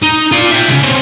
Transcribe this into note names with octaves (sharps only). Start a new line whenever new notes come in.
D#4
F4 D5
E5 G5
C#2 C#3
C4 C#4